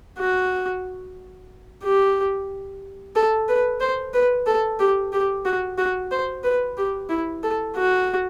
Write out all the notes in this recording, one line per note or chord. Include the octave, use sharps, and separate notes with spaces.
F#4
G4
A4
B4
C5
B4
A4
G4
G4
F#4
F#4
C5
B4
G4
E4
A4
F#4